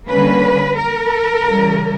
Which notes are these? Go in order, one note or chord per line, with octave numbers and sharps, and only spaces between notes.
D3 G3 A#3 C#4 B4
A#4
C#3 E3 G3